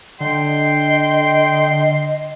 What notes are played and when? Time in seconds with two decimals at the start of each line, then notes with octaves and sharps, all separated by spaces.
0.20 D3 D#5 G5 C6